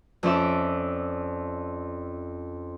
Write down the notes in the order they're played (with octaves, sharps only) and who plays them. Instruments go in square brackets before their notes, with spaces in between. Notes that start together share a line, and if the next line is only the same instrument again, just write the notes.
[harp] F2 C#4 D5 E5